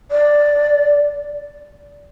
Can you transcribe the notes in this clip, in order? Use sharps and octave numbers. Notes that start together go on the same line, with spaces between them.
D5